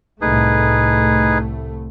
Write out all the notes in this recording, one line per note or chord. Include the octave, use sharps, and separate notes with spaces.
C2 A2 A3 D#4 G#4 B4